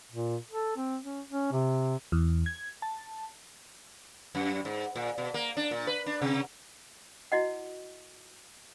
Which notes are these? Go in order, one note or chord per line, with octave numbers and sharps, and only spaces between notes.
A#2
A4
C4
C#4
C#4
C3
E2
G#6
A5
F#2
G#2
A#2
B2
A#3
D4
A#2
B4
D4
C3
E4 F#4 D#5 F#5